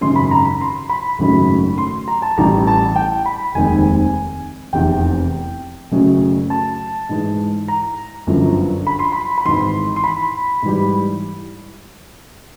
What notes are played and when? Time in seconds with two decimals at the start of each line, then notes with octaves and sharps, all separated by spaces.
0.01 G#1 F#2 C#3 C6
0.16 B5
0.31 A#5
0.45 B5
0.61 C6
0.89 B5
1.19 G#1 F#2 C#3 F#3 A3
1.78 C6
2.08 A#5
2.22 A5
2.38 A1 A2 E3 G3 A#5
2.67 A5
2.96 G5
3.26 B5
3.55 F1 D#2 D#3 G#3 C4 G#5
4.73 F1 E2 C3 G5
5.92 F#1 F#2 C#3 F#3 A3
6.50 A5
7.09 G#2 E3 G#3
7.68 A#5
8.27 G1 F#2 D3 F3
8.87 B5
8.99 C6
9.12 B5
9.38 B5
9.45 G#1 G#2 E3 C6
9.96 C6
10.04 B5
10.62 G#2 E3 G3